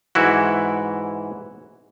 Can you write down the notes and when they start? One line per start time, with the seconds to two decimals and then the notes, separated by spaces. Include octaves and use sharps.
0.15 G#2 E3 E4 F#4